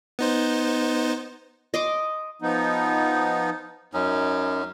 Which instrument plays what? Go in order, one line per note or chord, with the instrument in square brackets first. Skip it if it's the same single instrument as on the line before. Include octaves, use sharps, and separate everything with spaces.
[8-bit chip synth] B3 D#4 C5
[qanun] D#5 C6 D6
[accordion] F3 B3 D#4
[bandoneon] F#2 [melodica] C#4 D#4